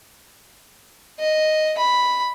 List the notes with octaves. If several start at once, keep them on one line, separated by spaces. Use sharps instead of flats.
D#5
B5